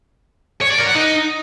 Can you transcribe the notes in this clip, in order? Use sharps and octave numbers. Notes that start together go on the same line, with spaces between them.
C#5
D5
A#4
F#5
D#4